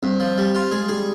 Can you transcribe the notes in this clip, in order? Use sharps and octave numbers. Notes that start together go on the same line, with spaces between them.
G2 C4
F3
G3
F4
G#3 G#4
G3 G#4